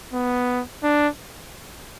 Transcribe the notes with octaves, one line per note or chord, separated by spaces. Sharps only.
B3
D4